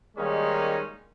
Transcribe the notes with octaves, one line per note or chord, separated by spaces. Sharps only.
D#3 G3 G#3 A#3 C#4 D#4